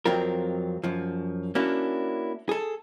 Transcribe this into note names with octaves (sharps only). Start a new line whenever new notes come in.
F2 F#3 C4 F4 A#4
F#2 F3
A#3 C#4 D4 E4 F#4
G#4 A4